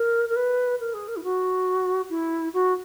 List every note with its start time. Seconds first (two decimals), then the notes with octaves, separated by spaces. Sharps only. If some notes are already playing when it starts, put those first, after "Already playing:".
Already playing: A#4
0.29 A#4
0.36 B4
0.80 A#4
0.94 G#4
1.08 A#4
1.16 E4
1.24 F#4
2.10 E4
2.54 F#4